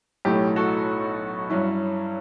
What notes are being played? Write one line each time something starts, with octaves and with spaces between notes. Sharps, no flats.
B1 A2 F#3 A3 G4
F#4 A4
G2 F#3 C#4 E4